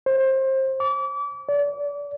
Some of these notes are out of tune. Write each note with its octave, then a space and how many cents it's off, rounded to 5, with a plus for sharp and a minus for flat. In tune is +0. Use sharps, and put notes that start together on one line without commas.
C5 +25
D6 -35
D5 -35